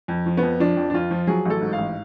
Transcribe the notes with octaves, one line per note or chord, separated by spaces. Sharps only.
F2
F3
B3
F2
F3 D4
F2
D4
F2 F4
F3
F#3 G#4
A1 A4
G#2
F5
A1